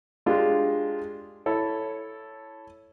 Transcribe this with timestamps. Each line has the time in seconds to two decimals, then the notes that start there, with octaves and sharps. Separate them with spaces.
0.26 G#3 D4 F4 G4 G#4
1.46 E4 A4 C#5